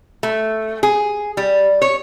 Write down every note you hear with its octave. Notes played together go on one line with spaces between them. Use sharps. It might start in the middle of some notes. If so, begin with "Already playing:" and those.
A3
G#4
G3
C#5